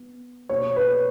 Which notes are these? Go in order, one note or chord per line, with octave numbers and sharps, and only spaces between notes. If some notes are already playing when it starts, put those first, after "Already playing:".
Already playing: B3
B2 A#3 C#5
B4